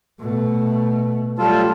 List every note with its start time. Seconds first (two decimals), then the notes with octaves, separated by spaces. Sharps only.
0.20 B2 A3
1.39 F#3 G3 A3 F4 A4